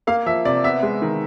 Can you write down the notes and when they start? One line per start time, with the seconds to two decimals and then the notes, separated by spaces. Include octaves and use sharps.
0.07 A#3 F5
0.26 F3 E5
0.45 C3 D5
0.64 B3 E5
0.82 G#3
1.02 D#3